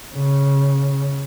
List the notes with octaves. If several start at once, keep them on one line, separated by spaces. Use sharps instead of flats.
C#3